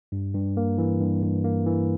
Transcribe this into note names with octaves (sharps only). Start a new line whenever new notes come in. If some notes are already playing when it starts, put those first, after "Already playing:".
G2
G2
A#3
E3
G2
G2
A#3
E3